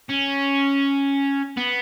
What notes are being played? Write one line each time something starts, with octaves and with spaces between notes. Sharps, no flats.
C#4
B3